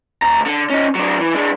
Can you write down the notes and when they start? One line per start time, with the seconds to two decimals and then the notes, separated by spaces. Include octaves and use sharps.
0.22 D2 A#5
0.46 D3
0.70 C#4 D#4
0.95 F#3 D4
1.20 E3
1.34 G#3 D4